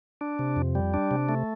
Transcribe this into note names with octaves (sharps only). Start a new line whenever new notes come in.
D4
C3
F2
G3
D4
C3
A3